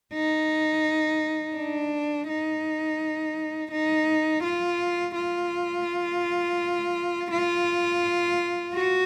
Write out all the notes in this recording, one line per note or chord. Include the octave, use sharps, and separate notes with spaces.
D#4
D4
D#4
D#4
F4
F4
F4
F#4